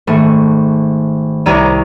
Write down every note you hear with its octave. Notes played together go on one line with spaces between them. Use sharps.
G#1 A3
C2 C#5 D5 A#5 E6 D#7